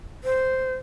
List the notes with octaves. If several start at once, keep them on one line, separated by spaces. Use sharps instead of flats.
C5